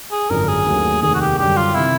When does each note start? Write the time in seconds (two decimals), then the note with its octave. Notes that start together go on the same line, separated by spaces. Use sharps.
0.12 G#4
0.30 G#1 F#2 D3 F3 A#4
0.48 G#4
0.66 D#2 D#3 F#3 A3 C#4
1.02 F1 D#2 D#3 G#4
1.15 F#4
1.21 G4
1.38 F#2 D3 G3 G4
1.57 F4
1.75 C3 D#3 E4